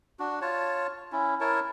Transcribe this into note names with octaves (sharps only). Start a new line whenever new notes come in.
D4 F#4
F4 C#5 A5
C#4 E4
E4 A#4 C#5 A5